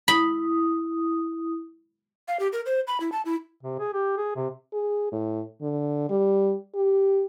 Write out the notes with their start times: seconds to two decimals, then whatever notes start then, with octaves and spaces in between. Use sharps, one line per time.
0.08 E4 B5 D#6
2.28 F5
2.40 G4
2.53 A#4
2.66 C5
2.87 B5
3.00 E4
3.12 A5
3.25 E4
3.63 C3
3.79 G#4
3.93 G4
4.17 G#4
4.36 C3
4.73 G#4
5.12 A2
5.62 D3
6.09 G3
6.75 G4